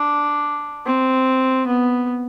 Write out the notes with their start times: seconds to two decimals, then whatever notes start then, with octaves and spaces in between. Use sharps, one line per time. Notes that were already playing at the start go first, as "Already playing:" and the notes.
Already playing: D4
0.86 C4
1.66 B3